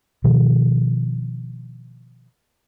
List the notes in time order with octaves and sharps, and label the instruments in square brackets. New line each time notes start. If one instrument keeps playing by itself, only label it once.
[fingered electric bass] B2 D#3 F3